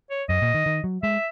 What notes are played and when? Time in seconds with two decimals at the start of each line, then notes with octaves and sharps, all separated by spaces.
0.10 C#5
0.29 F#2 D#5
0.42 A#2
0.54 D#3
0.66 D#3
0.84 F#3
1.03 G#3 E5